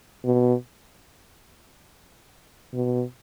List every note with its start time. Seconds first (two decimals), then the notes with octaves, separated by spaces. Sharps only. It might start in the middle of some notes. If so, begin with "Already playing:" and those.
0.25 B2
2.74 B2